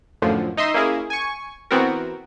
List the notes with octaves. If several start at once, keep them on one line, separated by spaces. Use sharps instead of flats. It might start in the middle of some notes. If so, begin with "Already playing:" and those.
F#2 A2 D3 F3
D#4 D#5 E5 C6
A#3 C#4 E4 G#4
G#5 C#6
E3 B3 C4 F#4 A#4